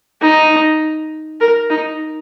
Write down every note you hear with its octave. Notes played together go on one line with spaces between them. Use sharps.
D#4
A#4
D#4